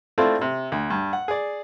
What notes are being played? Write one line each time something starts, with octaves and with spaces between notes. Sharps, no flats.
A3 C4 D4 E4 F4 A4
C3
D2
G2
F#5
G#4 D5